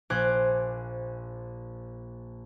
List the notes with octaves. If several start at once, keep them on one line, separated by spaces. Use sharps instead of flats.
A#1 C5 G#5 D6 F#6 G#6